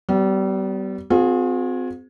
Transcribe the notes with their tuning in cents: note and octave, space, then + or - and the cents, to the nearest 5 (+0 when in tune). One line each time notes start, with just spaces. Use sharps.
G3 -30 B3 +25
C4 -30 F4 +45 G#4 +10